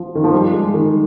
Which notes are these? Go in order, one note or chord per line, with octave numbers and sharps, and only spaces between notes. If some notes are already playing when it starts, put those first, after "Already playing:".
Already playing: F3
D#3
F3
G3
G#3
D#3